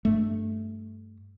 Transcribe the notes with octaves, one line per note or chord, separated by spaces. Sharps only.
G2 A3